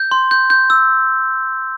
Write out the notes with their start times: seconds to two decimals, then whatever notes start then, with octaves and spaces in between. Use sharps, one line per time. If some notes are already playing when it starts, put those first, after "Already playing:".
Already playing: G6
0.11 C6
0.31 G6
0.50 G6
0.70 E6